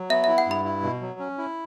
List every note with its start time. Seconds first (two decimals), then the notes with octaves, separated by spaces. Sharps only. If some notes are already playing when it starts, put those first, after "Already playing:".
Already playing: F#3
0.10 B3 E5
0.24 E4 E5
0.38 F#5
0.47 G2 B5
0.65 E4
0.83 B2
1.01 F#3
1.19 C#4
1.38 E4